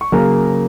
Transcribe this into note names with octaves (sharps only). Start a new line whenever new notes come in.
C#6
C#3 F#3 A#3 A#5